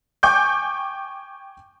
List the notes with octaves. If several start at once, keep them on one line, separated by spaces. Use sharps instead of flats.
G5 G#5 C#6 D6 G6